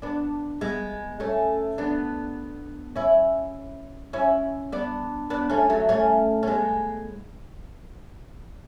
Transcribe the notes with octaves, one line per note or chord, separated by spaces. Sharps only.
B3 D4
G#3 B3
A3 C#4
B3 D4
C#4 E4
C#4 E4
B3 D4
B3 D4
A3 C#4
F#3 A3
A3 C#4
C#4
G#3 B3